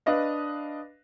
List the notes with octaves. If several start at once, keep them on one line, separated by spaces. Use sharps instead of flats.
D4 B4 D#5 F5